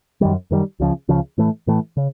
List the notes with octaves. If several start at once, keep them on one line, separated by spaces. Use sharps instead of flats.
F#2 D#3 G3
F#2 D#3 G3
C#2 C#3 F3
C#2 C#3 F3
A2 E3 A3
A2 E3 A3
C#3